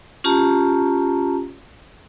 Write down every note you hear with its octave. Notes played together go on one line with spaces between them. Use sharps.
C#4 F4 G4 A5 A#5